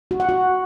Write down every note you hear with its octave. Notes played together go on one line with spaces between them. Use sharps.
F#4
F#5
F#4